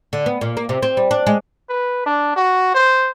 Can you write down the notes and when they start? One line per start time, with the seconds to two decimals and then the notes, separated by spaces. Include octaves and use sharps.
0.13 D3
0.26 B3
0.41 A#2
0.57 A#3
0.69 C3
0.82 C4
0.97 G3
1.11 D4
1.27 G#3
1.69 B4
2.06 D4
2.36 F#4
2.75 C5